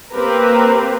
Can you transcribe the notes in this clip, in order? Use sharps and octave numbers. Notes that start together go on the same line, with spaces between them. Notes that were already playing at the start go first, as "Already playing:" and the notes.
A#3 C4 G4 A#4 B4